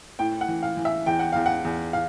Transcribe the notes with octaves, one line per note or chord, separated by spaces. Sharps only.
A2 G5
F#5
E3
F5
E3
E5
E2 G5
F#5
E2 F5
F#5
E2
F5